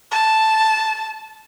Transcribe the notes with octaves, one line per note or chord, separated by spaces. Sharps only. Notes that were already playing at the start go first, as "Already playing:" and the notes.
A5